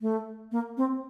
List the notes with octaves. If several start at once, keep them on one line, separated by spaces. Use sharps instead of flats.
A3
A#3
C4